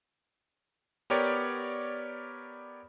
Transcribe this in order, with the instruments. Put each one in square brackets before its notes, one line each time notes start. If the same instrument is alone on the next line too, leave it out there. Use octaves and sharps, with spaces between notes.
[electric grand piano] B3 G4 A#4 C#5 D5